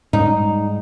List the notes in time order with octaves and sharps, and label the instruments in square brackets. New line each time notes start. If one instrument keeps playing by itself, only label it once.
[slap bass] G#2 G3 [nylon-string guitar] D#4